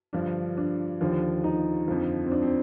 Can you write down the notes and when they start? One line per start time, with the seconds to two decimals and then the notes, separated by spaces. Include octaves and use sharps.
0.13 G2 D3 F3 D4
0.57 D4
1.01 D#2 D3 F3
1.44 D#4
1.88 F2 D3 F3
2.26 C4
2.32 D4
2.43 C4